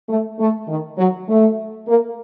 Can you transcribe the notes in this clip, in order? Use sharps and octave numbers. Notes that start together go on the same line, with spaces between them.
A3
A3
D#3
F#3
A3
A#3